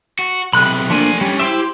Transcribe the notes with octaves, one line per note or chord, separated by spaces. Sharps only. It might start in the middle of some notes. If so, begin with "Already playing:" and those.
F#4
B1 C3 B5 F#6
F3 A3 A#3 D4 G#5
G3 C#4 D4
E4 G4 C5 E5